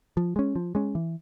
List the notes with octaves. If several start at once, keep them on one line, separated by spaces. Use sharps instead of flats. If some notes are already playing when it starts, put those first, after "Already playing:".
F3
G#3 C#4
F3
G#3 C#4
E3